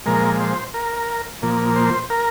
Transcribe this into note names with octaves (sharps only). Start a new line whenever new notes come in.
A#2 F3 G#3 A#4
C5
A#4
A#2 F3 A#3
C5
A#4